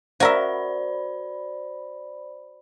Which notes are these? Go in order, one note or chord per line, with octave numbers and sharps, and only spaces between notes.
F#4 A#4 C5 D5 E5 B5